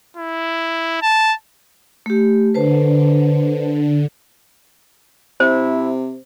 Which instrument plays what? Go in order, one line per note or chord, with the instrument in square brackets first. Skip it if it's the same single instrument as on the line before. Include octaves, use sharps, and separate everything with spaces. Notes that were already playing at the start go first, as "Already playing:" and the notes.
[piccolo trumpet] E4
A5
[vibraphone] A3 G4
[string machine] D3 [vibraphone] B4 C5 A5
[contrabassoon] C3 [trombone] E4 [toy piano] C5